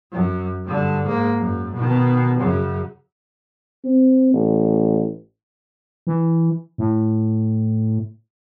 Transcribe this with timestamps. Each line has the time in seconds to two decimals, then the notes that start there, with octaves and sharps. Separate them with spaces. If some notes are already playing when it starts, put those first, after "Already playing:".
0.13 F#2
0.65 G2 D3
1.04 G#2 A#3
1.40 F#2
1.74 B2 D#3
2.37 F#2 C#3
3.85 C4
4.34 A1
6.07 E3
6.78 A2